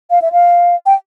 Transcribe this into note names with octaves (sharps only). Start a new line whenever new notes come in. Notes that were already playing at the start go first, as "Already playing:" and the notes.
F5
E5
F5
G5